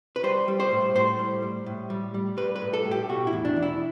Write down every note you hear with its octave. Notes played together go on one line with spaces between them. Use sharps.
B4
G3 C5
G3
C5
A2
A2 C5
G3
G3
A2
G3
G3
G3 B4
B4
A2
A4
A2
G4
B2 F#4
E4
E2
D4
E2
E4